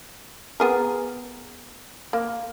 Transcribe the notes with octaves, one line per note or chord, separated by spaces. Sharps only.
B3 G#4 A#4
A#3